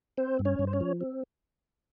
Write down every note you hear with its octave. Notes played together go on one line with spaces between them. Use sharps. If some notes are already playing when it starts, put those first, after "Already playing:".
C4 C5
G2
C#4 C#5
G2
C5
C#4 C#5
F3
C4